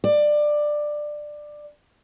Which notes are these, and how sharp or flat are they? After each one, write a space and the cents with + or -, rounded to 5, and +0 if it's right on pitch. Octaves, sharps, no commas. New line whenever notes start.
D5 +15